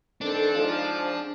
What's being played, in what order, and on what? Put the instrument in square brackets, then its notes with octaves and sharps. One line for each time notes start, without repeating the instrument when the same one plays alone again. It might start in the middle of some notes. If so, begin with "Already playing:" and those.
[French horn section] D#3 C4 A4 [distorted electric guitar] D4
[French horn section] G#2 F3